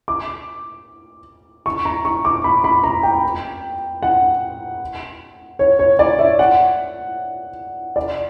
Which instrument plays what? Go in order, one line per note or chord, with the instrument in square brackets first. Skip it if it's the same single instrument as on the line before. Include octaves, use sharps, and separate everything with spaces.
[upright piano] D6
C#6
A#5
C#6
D6
B5
B5
A#5
G5
F#5
C#5
C#5
D5
E5
F#5
D5